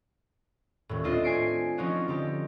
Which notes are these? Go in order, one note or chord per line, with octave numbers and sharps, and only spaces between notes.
D#1 A2
C4 D4 F4 D#5
G#5 C7 D7
F3 C4 C#4 D#4 F4 F#4
D3 D#4 G4